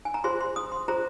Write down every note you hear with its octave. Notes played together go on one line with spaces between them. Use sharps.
G#5
A#5
F4 G#4 C5 C6
C6
D#6
C6
F4 G#4 C5 A#5